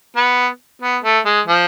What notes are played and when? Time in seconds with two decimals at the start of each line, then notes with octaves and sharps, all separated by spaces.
0.16 B3
0.82 B3
1.04 A3
1.25 G#3
1.47 F3